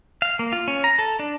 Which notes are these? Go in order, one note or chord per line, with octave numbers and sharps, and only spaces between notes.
F5
A#3
F4
C#4
A#5
A4
D4